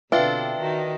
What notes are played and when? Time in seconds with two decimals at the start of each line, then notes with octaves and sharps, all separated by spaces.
0.12 B2 D3 C4 D4 F4 B4 E5 G5
0.60 D#3 D#4 F#4